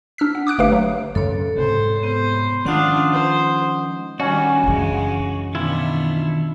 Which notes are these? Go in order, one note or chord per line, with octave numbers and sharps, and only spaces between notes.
D4 E6 F6 B6
F#5
D6 D#6 F#6 D7
G1 A3 G4 B4 F5 D7
F#3
F#2 C#3 A4 C#5
G#2 C3 C4 C5
B3 C5
D#3 F3 G#3 C#4 D4 F4 F#5 D#6
C5
D#3 G3 C#4 D4 F#4
F#2 C#3 E3 G#3
B2 D#3 B3 D4 E4 F4